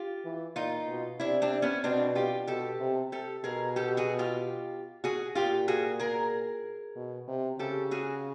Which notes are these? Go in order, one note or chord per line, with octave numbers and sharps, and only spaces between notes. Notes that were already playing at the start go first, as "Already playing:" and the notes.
Already playing: F4 G4
E3
A#2 D#4 F4
B2
C3 D4 E4
C4 D4
B3 C#4
B2 C4 D4
F4 G4
B2 G4 A4
C3
G4 A4
B2 G#4 A#4
G4 A4
F#4 G#4
F4 G4
F#4 G#4
A#2 F4 G4
F#4 G#4
G#4 A#4
B2
C3
C#3 G4 A4
F#4 G#4